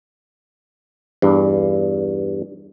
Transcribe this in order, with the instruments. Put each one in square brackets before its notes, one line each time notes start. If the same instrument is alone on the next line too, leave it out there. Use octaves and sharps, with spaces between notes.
[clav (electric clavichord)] E2 G2